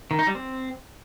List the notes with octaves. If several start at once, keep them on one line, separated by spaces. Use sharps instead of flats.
D#3
D#4
G3
C4